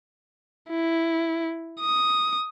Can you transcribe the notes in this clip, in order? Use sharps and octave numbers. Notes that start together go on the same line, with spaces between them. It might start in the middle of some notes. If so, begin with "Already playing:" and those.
E4
D#6